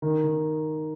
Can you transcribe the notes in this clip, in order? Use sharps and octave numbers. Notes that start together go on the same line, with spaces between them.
D#3
D#3